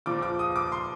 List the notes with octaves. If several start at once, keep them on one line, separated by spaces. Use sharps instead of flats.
A#2 F3 D6
D6
D#6
D6
C6